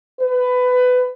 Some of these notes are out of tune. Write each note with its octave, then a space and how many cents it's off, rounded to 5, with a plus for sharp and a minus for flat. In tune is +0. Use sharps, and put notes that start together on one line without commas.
B4 +20